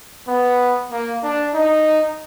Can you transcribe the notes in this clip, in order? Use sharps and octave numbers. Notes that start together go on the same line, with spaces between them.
B3
A#3
D4
D#4